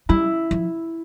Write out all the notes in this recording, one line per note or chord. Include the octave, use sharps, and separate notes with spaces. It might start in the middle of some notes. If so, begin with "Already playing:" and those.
G3 E4
F3